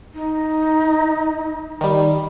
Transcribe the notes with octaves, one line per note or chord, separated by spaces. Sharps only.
D#4
D#3 G3